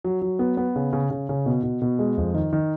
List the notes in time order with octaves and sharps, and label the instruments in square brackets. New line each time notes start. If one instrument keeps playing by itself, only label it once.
[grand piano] F#3
F#3
B3
B3
C#3
C#3
C#3
C#3
B2
B2
B2
G#3
F2
D#3
D#3